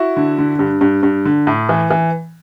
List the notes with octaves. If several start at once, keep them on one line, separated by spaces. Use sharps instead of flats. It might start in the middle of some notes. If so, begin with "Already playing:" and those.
Already playing: E4 F#4
D3
D3
G2
G2
G2
D3
A2
E3
E3